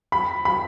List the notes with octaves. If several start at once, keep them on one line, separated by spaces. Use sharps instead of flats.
B5
B5